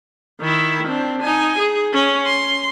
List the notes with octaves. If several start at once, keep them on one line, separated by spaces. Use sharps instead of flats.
D#3 E4
C4 D4
D#4 G#5
G#4
C#4
C6